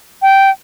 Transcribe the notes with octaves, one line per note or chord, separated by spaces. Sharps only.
G5